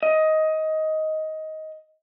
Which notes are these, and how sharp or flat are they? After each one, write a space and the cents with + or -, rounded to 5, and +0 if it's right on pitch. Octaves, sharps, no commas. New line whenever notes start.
D#5 +15